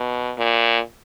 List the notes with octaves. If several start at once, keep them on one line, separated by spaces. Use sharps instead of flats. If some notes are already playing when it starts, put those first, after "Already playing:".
Already playing: B2
A#2